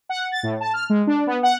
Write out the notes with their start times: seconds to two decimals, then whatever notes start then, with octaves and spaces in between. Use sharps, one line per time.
0.09 F#5
0.31 A6
0.43 A2
0.60 A5
0.73 F6
0.90 G#3
1.07 D4
1.27 B3
1.43 F#5